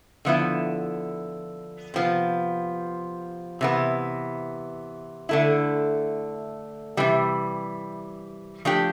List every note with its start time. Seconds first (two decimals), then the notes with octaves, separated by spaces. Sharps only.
0.25 D3 F3 B3 E4
1.94 C3 F3 B3
3.61 C3 E3 B3
5.29 D3 A3 E4
6.97 C3 E3 G3
8.65 F3 A3 D4 G4